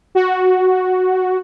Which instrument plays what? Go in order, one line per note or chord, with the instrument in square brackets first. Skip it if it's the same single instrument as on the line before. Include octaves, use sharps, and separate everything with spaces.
[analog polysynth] F#4